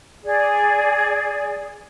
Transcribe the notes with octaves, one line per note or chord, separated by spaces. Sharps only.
G#4 D5